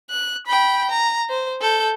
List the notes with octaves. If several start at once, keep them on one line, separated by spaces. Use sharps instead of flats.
F#6
G5 B5
A#5
C5
A4 G6